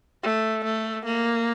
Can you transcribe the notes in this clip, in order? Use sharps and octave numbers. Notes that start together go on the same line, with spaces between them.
A3
A3
A#3